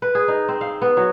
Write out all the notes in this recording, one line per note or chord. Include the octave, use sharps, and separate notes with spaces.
B4
G#4
D#4
C4
F5
B3
F#3